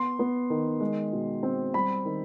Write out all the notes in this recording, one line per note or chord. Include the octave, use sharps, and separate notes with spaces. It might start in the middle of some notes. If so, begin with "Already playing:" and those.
Already playing: B3 C6
B3
D#3
G#3
B2
C4
G3 B5
D#3